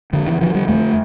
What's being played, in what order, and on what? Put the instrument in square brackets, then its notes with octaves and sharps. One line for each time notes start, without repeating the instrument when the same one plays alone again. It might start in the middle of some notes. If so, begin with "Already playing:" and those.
[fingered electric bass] F2 D3
E3
D3 F3
G3
F2 A3